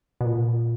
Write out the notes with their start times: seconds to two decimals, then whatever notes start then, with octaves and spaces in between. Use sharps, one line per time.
0.21 B2
0.25 A#2